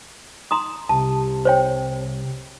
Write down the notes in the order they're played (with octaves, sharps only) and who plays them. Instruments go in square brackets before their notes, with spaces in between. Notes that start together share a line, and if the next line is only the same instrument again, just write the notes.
[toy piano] A#5 C6 D#6
[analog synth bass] C2 [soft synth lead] C3 [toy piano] A5
[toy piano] C5 C#5 G5